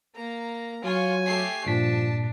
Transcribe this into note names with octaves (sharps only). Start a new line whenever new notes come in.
A#3 A#5
F#3 F4 G#5 C#6
A3 G4 C7
G2 A#2 F3 D4 A5 B6